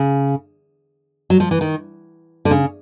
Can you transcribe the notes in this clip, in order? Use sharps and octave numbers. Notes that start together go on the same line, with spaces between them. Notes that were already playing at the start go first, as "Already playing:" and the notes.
Already playing: C#3
F#3
F3
E3
D#3
D3
C#3